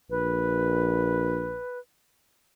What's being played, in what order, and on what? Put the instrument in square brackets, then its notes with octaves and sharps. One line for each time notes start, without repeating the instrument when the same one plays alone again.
[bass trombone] A#1 [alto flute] B4